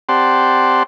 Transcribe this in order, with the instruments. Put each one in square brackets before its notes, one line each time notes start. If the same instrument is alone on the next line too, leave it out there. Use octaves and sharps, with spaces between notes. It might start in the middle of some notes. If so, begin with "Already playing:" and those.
[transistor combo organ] C4 G4 D5 F#5 A5 C6